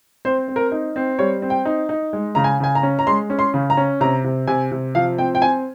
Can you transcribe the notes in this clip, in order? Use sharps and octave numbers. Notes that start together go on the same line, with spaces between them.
C4 C5
C4
A#4
D#4
C4
G3 C#5
C4
G5
D#4
D#4
G#3
C#3 A#5
G#5
C#3 G#5
A#5
C#4
A#5
G#3 C6
C#4
C6
C#3
A#5
C#4
C3 A#5
C3
C3 G#5
C3
F3 F5
C4 G5
G5
C4 G#5